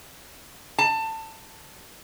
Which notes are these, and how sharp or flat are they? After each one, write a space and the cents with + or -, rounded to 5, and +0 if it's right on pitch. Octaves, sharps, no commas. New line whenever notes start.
A5 +20